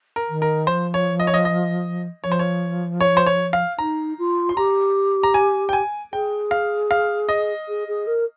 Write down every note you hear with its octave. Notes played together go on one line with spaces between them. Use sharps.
A#4
D#3
A#4
F3 C5
C#5
D#5
C#5
D#5
D#5
F3 C#5
C5
C#5
C#5
C5
C#5
F5
D#4 A#5
F4
C6
G4 A#5
A#5
G#5
G5
G#5
G#4 G5
F5
F5
D#5
G#4
G#4
A#4